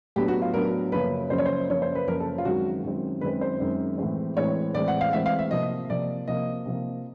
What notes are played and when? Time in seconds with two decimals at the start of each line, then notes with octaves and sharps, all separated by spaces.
0.16 A2 F#3 B3 D4 G4
0.28 F#4
0.42 F4
0.54 A2 F#3 B3 D4 A#4
0.92 F#2 C#3 F3 A#3 C#4 B4
1.30 F#2 C#3 F3 A#3 C#4 C5
1.38 C#5
1.46 C5
1.70 F#2 C#3 F3 A#3 C#4 C#5
1.82 C5
1.95 B4
2.08 F#2 C#3 F3 A#3 C#4 A#4
2.20 A4
2.38 F4
2.45 F#2 D#3 G#3 C4 F#4
2.83 F#2 D#3 G#3 C4
3.21 F#2 D#3 G#3 C4 B4
3.41 C5
3.60 F#2 D#3 G#3 C4
3.98 A2 E3 G#3 C4
4.37 A2 E3 G#3 C4 C#5
4.74 A2 E3 G#3 C4 D5
4.88 F#5
5.01 F5
5.13 A2 E3 G#3 C4 E5
5.26 F5
5.39 E5
5.51 C3 F3 A#3 D#5
5.90 C3 F3 A#3 D5
6.28 C3 F3 A#3 D#5
6.66 C3 F3 A#3